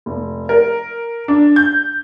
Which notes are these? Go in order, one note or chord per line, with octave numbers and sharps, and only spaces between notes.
F1
A#4
D4
G6